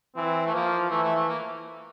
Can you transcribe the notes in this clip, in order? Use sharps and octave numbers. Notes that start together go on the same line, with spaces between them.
E3 C4
A3
F3 A#3
E3 A3
A3
A3
A#3